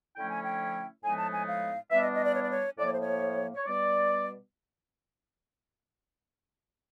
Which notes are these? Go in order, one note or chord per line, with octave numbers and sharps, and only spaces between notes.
D3 F3 A3 C#4 E4 G5
G#5
G5
A2 F3 G#3 B3 D#4 G#5
A5
G#5
F5
E3 G3 B3 D4 E5
D#5
D#5
D5
C#5
D5
C#5
A2 F3 A#3 D5
C#5
C5
C#5
C#5
B2 G3 B3 D5